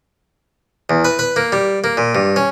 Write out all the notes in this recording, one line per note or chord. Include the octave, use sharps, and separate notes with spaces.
E2
B4
B4
A#3
G3
A#3
A#2
G2
C#4